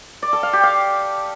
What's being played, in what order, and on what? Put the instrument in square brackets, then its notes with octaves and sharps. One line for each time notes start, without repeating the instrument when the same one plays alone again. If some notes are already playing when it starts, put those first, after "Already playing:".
[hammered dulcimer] D5
A4
F5
G4
F5